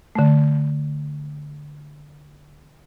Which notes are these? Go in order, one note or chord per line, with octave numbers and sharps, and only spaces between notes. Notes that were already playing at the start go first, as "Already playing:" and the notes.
D3 A3